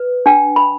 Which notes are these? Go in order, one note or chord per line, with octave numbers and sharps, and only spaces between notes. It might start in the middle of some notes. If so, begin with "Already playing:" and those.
Already playing: B4
D4 G5
B5